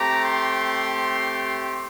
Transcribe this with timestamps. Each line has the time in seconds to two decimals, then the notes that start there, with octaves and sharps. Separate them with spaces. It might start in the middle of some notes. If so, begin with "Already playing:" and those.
Already playing: A3 C4 G4 A#5
0.24 C6